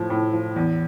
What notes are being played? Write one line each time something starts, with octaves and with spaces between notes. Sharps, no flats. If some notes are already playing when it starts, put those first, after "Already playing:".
Already playing: A2 F3
A2
F3
E2